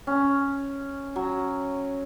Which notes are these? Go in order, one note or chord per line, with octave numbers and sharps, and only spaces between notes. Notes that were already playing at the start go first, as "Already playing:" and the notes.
C#4
F#3